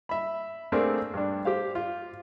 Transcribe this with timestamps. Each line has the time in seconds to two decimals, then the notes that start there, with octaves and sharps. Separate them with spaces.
0.09 E5 B5
0.72 A3 A#3 C4 D4 G#4 A#4
1.14 G2 D4
1.45 G4 C5 F5
1.75 F4